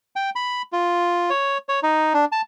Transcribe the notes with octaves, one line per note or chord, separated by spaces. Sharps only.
G5
B5
F4
C#5
C#5
D#4
D4
A5